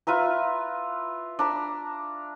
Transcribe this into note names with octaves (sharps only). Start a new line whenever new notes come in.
F4 B4 E5 A#5
D4 A#5 B5